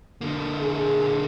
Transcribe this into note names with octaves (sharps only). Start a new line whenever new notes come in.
D3 A#3
G#4